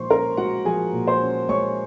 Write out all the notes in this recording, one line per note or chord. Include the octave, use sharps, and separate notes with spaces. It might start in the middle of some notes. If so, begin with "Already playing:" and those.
Already playing: A#2 F3 G#3 C5 C6 C#6
C#4 A#4 A#5
G#3 F#4 F#5
F3 G#4 G#5
A#2
C5 C6
C#4
G#3 C#5 C#6